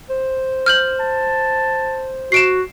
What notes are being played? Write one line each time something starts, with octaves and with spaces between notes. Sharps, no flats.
C5
F6 G6 F#7
A5
F#4 C7 D7 E7